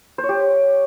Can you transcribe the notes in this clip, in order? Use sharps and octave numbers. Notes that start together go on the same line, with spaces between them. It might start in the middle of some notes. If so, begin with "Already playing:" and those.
C5
C#5
G4